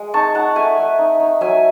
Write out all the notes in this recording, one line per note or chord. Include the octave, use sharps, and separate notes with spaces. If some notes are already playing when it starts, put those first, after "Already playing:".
Already playing: G#3
D#4 A5 C#6
D#4 F#5 A5
A3 E5 G#5
A3
D#4
D#4
F#3 E5 G#5